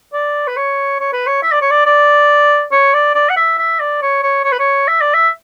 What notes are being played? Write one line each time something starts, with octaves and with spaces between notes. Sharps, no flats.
D5
B4
C#5
C#5
B4
C#5
E5
D5
C#5
D5
D5
C#5
D5
D5
F#5
E5
E5
D5
C#5
C#5
C#5
B4
C#5
E5
D5
E5